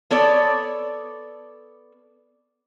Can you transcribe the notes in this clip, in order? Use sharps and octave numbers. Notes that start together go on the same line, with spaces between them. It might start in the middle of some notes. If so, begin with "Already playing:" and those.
B3 A4 C#5 D5